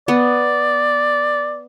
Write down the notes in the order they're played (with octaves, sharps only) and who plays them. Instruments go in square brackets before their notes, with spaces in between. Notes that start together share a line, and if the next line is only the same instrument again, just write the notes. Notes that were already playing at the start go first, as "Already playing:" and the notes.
[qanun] B3 [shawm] D5